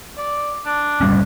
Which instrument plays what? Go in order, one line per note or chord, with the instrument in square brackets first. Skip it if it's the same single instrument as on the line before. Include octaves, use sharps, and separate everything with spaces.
[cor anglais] D5
D4
[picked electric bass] F#1 G3 C#4